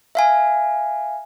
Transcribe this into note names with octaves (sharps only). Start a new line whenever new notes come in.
E5 F5 G#5